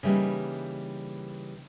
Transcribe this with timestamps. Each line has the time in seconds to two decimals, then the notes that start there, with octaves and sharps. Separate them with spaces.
0.03 C#3 E3 G3 A#3 D#4